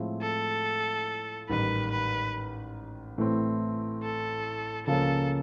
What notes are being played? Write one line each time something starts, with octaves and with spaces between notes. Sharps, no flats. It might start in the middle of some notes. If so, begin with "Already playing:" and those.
Already playing: A2 F3 G#3 C4 E4
A4
A1 G#2 D#3 G3 B4
B4
A2 E3 A3 C4
A4
C#2 C#3 F3 A#3 C#4 A4